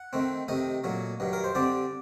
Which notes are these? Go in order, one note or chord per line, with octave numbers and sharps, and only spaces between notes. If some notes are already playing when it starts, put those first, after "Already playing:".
Already playing: F#5
D#3 A3 C4
C3 D#3 A3 D#5
A#2 F#3 A3
G2 D#3 F#3
A#4
C5
D3 G3 C4 D5